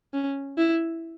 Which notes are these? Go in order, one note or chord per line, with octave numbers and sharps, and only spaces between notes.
C#4
E4